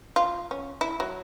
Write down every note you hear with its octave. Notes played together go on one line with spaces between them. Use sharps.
F4
C#4
E4
F#3